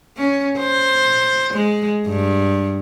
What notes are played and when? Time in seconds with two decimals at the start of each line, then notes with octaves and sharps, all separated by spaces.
0.17 C#4
0.58 C5
1.53 G#3
2.07 G2